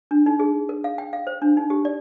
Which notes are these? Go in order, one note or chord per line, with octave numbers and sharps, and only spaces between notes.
D4
D#4
G#4
A#4
F5
G5
F5
C5
D4
D#4
G4
D5